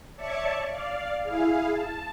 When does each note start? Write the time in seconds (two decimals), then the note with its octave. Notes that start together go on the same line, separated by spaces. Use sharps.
0.16 C#5 D5 E5 A5 C#6
0.66 D5 F5
1.23 E4 G#4 F5
1.71 A5